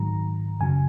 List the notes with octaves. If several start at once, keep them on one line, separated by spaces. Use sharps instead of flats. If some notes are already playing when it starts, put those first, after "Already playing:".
Already playing: G#2 D#3 F#3 A#5
F#2 C#3 F#3 G#5